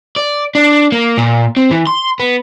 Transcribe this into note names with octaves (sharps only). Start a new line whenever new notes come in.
D5
D4
A#3
A#2
C4
E3
C6
B3